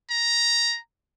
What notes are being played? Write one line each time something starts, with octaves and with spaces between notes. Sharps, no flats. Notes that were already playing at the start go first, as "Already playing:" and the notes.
A#5